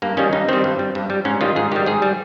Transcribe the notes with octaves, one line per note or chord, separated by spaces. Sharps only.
G2 A#3
D#3 G3 C#4
G2 D#4
D#3 G3 C4
G2
G3
G2
G3
G#2 C#4
D#3 G3 F4
G#2 G#4
D#3 G3 G4
G#2 G#4
G3